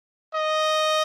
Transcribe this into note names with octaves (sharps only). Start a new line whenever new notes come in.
D#5